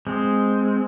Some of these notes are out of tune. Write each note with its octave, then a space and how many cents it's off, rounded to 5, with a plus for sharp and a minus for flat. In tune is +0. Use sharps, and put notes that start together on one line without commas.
G#3 +0 C4 -5